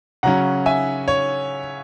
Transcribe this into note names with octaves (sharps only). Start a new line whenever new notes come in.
C#3 F#3 C#4 F#5 A#5
E5 G#5
C#5